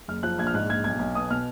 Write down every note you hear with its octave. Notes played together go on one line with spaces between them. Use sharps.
F#1 F6
F3 F#6
A#1 G#6
F6
G#2 F#6
A#1 G#6
B1 G#6
B1
B2 D#6
B2 F6